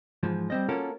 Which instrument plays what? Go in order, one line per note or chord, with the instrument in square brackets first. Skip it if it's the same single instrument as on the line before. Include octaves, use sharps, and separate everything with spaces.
[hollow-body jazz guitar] G#2 E3 F3
G3 C4 D#5
A#3 C#4 F4 F#4 A4 A#4